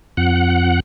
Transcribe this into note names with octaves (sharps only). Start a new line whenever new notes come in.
F2 F#5